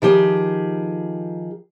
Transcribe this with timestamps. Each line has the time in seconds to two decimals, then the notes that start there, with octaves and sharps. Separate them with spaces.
0.02 D#3 F3 G4 G#4